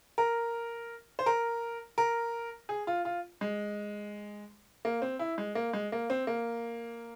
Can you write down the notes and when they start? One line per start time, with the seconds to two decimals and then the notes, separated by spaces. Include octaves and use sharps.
0.18 A#4
1.19 C5
1.26 A#4
1.98 A#4
2.69 G#4
2.87 F4
3.05 F4
3.41 G#3
4.85 A#3
5.02 C4
5.19 E4
5.38 G#3
5.55 A#3
5.73 G#3
5.92 A#3
6.10 C4
6.27 A#3